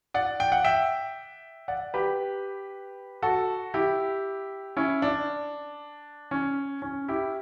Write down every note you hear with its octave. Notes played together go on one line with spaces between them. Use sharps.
D5 F#5
G5
F#5
E5 G5
D5 F#5
G4 B4
F#4 A4
E4 G4
C#4 E4
D4
C#4
C#4
E4 G4